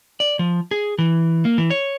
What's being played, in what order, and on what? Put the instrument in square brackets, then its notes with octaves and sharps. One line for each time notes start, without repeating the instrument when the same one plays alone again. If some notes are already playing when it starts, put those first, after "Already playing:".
[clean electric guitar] D5
F3
G#4
E3
A#3
E3
C#5